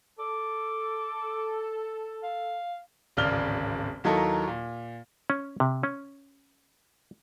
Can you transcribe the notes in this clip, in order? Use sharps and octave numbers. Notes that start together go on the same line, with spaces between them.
A4 D6
F5
D1 G#1 C#3 D5 F6 G7
D#2 F#3 D#4 E4 A4 A#4
A#2
C#4
C3
C#4